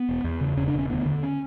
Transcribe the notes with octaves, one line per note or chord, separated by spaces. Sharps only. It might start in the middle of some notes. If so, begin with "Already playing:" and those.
Already playing: B3
E1
E2
C#3
E1 C#4
D4
E1
C#4
D2 B3
D3
C#4